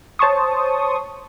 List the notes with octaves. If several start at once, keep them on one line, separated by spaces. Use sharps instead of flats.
C5 C#5 A5 C6 C#6 D#6